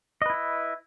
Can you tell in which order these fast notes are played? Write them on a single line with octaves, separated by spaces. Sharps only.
D#5 B4 E4 E5